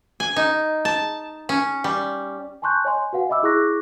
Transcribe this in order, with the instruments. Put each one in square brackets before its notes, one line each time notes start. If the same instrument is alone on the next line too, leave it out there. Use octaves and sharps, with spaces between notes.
[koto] G#5
D#4
A5
C#4
G3
[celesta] G#5 A5 C6 C#6 F#6 G6
C#5 D#5 G#5 C6
F#4 B4 F5 F#5 G#5
D#5 E5 B5 D6 E6
E4 G#4 C#6 D6 F#6 A#6